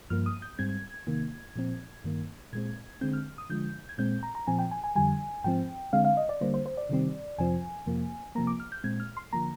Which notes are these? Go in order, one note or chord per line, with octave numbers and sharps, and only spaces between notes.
G2 F3 A#3 F6
D#6
G6
G#2 G3 C4 G#6
C3 D#3 A#3
A#2 F3 C4
G2 D#3 A#3
A#2 G#3 C4 G#6
D3 G#3 C4 G6
F6
D#6
D3 F3 G#3 G6
G#6
A#2 G#3 C4 G6
A#5
A#5
A#2 F3 C4 G#5
G5
G#5
G#5
F2 D3 G3 G#5
G#2 F3 C4 G5
D3 G#3 C4 F5
F5
D#5
D5
D3 G3 A#3 C5
C5
C5
D5
C3 D#3 G3 C4
F2 C3 F3 C4 G#5
F2 C3 F3 A#3
C3 F3 A#3 A#5
D6
F6
G6
A#2 G#3 C4 G#6
F6
C6
D3 F3 A#3 A#5